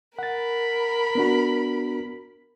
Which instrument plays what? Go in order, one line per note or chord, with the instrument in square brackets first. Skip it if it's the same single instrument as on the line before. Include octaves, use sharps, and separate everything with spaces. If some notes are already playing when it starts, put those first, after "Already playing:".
[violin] A#4 B5 [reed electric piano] F#5 A6
[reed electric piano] B3 D4 F#4